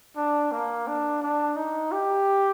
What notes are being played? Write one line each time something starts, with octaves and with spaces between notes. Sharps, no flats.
D4
A#3
D4
D4
D#4
G4